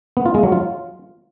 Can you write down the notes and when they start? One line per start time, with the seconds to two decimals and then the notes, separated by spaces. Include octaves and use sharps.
0.17 B3
0.26 F4
0.34 G#3
0.43 F#3
0.52 F4